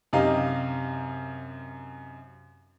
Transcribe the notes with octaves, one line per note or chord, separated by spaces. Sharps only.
F#2 C3 D#4 G4 F5